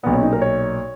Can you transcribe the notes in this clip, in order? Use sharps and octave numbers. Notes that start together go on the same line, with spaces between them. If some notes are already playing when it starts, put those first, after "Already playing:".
B1 A#2 B3
C#4
D#4
A#4
C#5